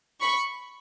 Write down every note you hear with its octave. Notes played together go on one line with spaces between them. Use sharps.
B5 C#6